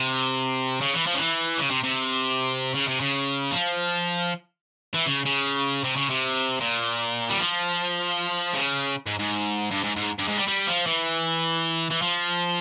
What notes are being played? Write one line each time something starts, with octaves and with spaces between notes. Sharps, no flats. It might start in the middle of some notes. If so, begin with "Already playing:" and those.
Already playing: C3
C#3
E3
F3
C#3
E3
C#3
C3
C3
C#3
C3
C#3
F3
E3
C#3
C#3
C3
C#3
C3
A#2
G3
F3
C#3
G#2
G#2
G2
G#2
G#2
G2
G#2
G3
G3
F3
E3
E3
F3